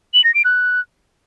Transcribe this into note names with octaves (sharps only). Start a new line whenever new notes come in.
F#7
A#6
D7
F#6